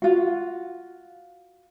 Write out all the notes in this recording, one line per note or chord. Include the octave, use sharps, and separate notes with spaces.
F4 F#4